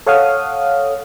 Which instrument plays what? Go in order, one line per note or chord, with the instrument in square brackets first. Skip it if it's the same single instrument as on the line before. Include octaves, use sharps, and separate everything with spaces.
[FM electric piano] A4 C#5 F5 F#5 D#6 F6